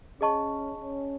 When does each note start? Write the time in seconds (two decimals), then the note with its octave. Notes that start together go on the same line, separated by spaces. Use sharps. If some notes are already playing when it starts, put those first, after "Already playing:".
0.21 C#4 G#4 D#5 A5 C#6
0.76 C#4